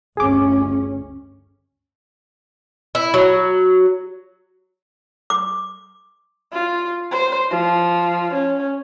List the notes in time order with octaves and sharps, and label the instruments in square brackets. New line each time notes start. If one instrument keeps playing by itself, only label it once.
[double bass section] G1 D2 C#4 [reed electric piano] G#4 D6
[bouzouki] E4
F#3
[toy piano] D6
[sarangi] F4
C5
F3
C#4